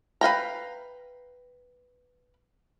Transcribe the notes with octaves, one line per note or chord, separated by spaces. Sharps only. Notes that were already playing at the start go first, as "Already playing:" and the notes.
B4 F5 G5 A#5